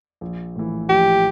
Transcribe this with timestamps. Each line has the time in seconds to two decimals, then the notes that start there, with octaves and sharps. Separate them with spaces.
0.21 A#1
0.56 A2 E3
0.88 A#1 G4